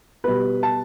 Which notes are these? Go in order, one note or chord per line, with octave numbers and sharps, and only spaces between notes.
B2 G3 B3 B4
A5